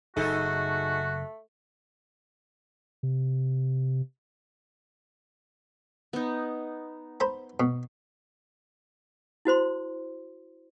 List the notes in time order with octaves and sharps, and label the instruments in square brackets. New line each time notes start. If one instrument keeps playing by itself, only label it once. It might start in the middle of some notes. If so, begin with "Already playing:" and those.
[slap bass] F#1 [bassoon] A3 [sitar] D#4 G#4 A4 [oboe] F#4
[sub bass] C3
[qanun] B3 D#4
[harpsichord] C5 A#5 B5
B2
[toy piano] E4 F#4 C5 C6